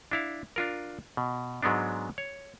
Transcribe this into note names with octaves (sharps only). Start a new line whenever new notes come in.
D4 E4 F5
D4 F4 A#4
B2
G#2 F#3 G#3 B3 D4
C#5